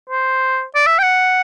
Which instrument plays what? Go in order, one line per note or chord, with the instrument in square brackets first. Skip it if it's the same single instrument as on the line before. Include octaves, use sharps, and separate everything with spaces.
[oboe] C5
D5
E5
G5
F#5